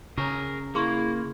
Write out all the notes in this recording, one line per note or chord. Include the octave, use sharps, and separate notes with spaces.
C#3 G#4 A#4 C#5 A#5 C#6
A#3 E4 G#4 C6 C#6